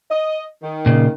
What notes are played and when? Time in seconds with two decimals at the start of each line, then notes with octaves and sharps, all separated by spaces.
0.11 D#5
0.62 D#3
0.86 A#2 C#3